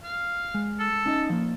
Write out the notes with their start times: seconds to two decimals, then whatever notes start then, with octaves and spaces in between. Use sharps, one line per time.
0.04 F5
0.54 G#3
0.80 A4
1.06 C#4 D#4 D#5
1.30 F3 A#3